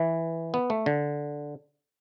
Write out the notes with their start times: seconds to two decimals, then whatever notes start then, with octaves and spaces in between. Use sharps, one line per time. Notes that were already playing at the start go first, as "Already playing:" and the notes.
Already playing: E3
0.54 B3
0.70 A3
0.86 D3